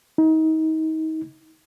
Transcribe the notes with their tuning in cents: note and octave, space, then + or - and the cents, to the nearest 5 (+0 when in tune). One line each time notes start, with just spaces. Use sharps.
D#4 +30